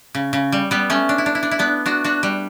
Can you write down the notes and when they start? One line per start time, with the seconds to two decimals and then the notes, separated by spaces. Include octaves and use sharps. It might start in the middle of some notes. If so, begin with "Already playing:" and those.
0.15 C#3
0.33 C#3
0.52 G3
0.71 G3 B3
0.90 A3 C#4
1.09 D4
1.18 E4
1.26 D4
1.35 E4
1.43 D4
1.51 E4
1.59 B3 D4
1.86 D4 F#4
2.04 D4 F#4
2.23 G3